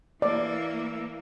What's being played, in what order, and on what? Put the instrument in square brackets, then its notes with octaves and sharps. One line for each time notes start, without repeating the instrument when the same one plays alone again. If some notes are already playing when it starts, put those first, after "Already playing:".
[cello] E3 A#3 [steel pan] D5